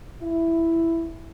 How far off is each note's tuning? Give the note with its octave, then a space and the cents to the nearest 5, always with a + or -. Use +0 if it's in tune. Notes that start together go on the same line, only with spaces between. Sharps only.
E4 +5